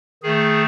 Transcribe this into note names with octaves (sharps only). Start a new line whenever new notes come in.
D#3 A3 G#4